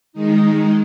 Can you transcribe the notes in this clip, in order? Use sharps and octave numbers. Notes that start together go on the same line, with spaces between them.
D#3 G#3 D#4